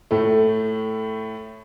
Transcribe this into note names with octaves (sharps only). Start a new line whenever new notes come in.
A2 A3